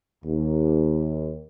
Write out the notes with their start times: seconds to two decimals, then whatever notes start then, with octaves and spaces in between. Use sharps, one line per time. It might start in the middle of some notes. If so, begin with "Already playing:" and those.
0.24 D#2